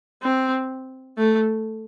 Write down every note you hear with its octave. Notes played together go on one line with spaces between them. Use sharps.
C4
A3